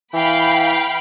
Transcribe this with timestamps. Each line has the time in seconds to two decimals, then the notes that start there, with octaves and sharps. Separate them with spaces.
0.14 E3 F5 G5 B5